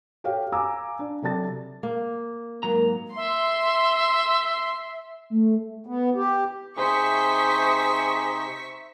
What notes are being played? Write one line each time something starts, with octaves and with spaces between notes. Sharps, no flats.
F#4 G4 A4 C#5 F5 G5
F5 G#5 A#5 D6 E6
D4
C3 F#3 A4 D5 A5 A6
A#3
G#2 F#3 A#3 A#5
E5 C6
A3
B3
G4
C3 D#4 G#4 C5 E5 C#6 B6